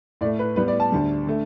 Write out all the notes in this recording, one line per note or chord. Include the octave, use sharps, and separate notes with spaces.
A2 A3 D5
B4
A2 G3 B3 B4
D5
A5
D2 D3 G3
D3 A3